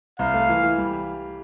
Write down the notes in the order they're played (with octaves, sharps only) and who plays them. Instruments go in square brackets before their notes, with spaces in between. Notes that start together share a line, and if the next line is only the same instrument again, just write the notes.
[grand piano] C2 [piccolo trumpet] F5
[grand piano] A3
E3
E3
G3